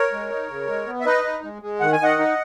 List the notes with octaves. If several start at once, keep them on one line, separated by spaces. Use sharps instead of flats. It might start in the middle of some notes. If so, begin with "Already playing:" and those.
Already playing: A#4 C#5
G#3
D#4
C#3
G#3
B3
E5
D#4 B4 D#5
D#4
G#3
G#3
D#3 F#5
G#5
D#3 D#5 F#5
D#4